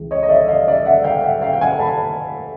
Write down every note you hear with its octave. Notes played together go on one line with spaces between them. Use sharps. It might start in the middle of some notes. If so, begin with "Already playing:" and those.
Already playing: C#2 C#3 E3
C#5 D#5
D#5
D5 E5
D#5 F5
D5 E5
E5 F#5
F5 G5
E5 F#5
F5 G5
G5
F#5 G#5
A5 B5